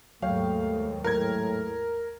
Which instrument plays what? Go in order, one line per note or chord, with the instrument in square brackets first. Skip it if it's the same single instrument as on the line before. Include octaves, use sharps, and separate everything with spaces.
[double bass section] D#2 G#2 [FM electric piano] F#3 C#5 G5 [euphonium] A3 [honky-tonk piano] F5
[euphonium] A2 [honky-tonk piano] A#4 G#6